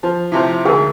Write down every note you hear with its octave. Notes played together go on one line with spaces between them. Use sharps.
F3
A2 C3 F3
D2 G#2 G#4 A#4